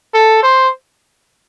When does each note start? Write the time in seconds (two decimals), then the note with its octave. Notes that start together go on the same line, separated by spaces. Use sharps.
0.14 A4
0.43 C5